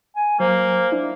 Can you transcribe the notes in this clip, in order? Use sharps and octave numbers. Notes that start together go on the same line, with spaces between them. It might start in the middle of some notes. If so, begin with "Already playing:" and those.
G#5
F#3 A#3 C5
D4 E4